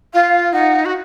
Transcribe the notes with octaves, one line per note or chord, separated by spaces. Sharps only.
F4 F5
D#4 F#5
F#4